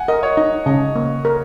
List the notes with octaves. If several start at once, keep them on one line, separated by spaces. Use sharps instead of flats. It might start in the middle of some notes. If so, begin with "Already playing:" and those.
Already playing: F#5 G#5
A#4 D#5
C#5
D#4 D#5
C#3 D#5
A#3
A#4